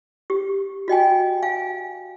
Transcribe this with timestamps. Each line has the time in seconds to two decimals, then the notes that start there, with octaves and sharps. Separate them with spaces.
0.30 G4
0.88 F#4 D#5 G5 G#5
1.43 F5 G#5